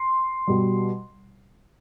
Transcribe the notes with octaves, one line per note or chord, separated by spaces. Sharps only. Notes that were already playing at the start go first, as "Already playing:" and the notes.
Already playing: C6
B2 G3